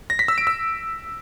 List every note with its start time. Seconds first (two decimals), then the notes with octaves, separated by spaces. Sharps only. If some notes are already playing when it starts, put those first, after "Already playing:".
0.10 A#6
0.19 B6
0.28 E6
0.38 D7
0.47 E6